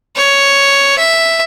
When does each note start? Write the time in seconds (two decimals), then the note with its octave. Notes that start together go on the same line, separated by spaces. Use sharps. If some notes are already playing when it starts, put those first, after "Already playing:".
0.17 C#5
0.98 E5